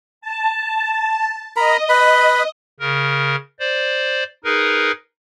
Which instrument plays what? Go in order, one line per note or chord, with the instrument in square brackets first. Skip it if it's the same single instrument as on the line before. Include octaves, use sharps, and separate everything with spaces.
[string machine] A5
[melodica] A#4 A#5 B5 [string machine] D#5
[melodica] B4 B5
[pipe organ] C#3 A#4
C5 D5
D#4 G#4 A#4 B4